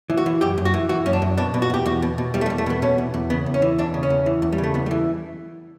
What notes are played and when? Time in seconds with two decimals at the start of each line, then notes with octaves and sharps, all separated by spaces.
0.10 E3
0.17 F#4
0.26 E3
0.41 F#2 G4
0.58 F#2
0.65 F#4
0.74 E3
0.89 E3 F#4
1.06 F#2 C#4
1.13 D4
1.22 F#2
1.38 B2 D4
1.54 B2
1.62 F#4
1.70 E2 G4
1.86 E2 F#4
2.02 B2
2.18 B2
2.34 E2 G3
2.41 A3
2.46 G3
2.50 E2
2.58 A3
2.66 B2 B3
2.82 B2 C#4
2.98 E2
3.14 E2
3.30 C#3 B3
3.46 E2
3.54 C#4
3.62 E3
3.78 E2 D4
3.94 C#3
4.03 C#4
4.10 E2
4.26 E3
4.42 E2
4.52 G3
4.58 C#3
4.64 A3
4.74 E2 B3
4.86 G3
4.91 E3